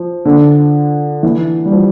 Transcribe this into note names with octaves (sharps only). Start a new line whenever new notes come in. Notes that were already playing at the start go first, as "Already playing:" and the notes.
Already playing: F3
D3
E3
G3
F3